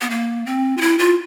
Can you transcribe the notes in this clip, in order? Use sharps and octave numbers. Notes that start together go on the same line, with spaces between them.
B3
A#3
C4
F4
E4
F4